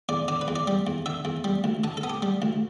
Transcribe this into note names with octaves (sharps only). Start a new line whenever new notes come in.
E2 D5
D3 D5
B4
E2
D5
G3
E2
D3 E5
E2
G3
D2
D3 A5
A4
B3
G4
G3
D2